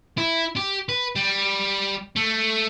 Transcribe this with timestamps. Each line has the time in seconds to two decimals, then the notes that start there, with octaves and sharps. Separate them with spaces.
0.18 E4
0.56 G4
0.89 B4
1.16 G3
2.16 A3